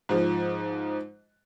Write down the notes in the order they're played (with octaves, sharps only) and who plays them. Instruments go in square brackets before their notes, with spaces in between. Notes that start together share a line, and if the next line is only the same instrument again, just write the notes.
[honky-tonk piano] G#2 F3